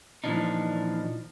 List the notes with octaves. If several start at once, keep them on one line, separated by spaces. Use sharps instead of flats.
A#2 E3 F3 D4 D#4